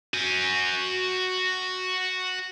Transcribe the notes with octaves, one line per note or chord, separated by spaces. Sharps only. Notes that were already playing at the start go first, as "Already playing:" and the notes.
F#4 G#5